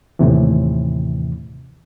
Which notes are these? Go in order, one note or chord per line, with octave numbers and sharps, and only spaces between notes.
D#2 A2 C3 E3